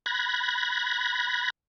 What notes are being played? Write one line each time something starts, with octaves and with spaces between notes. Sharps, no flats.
B5 F#6 G#6 A#6